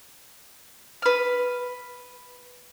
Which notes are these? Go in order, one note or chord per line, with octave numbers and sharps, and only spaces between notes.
B4 F6